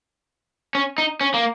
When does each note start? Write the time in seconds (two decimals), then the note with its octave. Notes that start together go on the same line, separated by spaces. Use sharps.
0.75 C#4
0.98 D#4
1.21 C#4
1.34 A#3